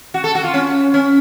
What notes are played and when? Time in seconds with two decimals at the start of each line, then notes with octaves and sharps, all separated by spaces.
0.14 F#4
0.24 A4
0.35 F#4
0.44 F4
0.54 C#4
0.94 C#4